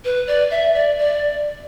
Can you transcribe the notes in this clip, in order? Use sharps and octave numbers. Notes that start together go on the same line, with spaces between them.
B4
D5
E5
D5
D5